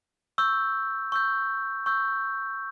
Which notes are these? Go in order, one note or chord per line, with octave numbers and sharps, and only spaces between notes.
C#6 E6 G6
C#6 E6 G6
C#6 E6 G6